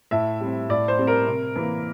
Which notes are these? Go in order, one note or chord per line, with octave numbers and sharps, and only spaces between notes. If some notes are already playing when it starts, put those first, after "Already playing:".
A2 E5
G3 C4
A2 D5
C5
G3 C4
A#4
C3
E3 A#3